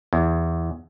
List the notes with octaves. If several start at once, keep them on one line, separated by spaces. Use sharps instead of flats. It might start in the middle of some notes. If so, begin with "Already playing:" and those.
E2